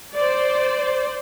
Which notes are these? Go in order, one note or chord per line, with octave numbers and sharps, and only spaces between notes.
C5 D5